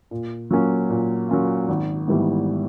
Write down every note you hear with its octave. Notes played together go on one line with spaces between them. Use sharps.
A#2
F#3 A#3 C#4 F4
A#2
F#3 A#3 C#4 F4
G#1
G#2 E3 G3 B3